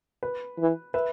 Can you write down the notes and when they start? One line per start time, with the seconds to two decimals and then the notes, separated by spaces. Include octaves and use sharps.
0.23 B4
0.59 E3
0.94 B4 E5